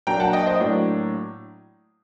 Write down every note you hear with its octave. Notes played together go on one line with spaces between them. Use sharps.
F#3 A#3 D4 G5 A#5
F#5 A5
D#5 G5
C5 D#5
A2 F#3 A#3 D4